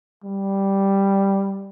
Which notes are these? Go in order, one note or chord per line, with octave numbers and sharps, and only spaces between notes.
G3